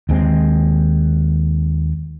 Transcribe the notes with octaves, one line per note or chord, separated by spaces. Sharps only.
D#2 G#3 C4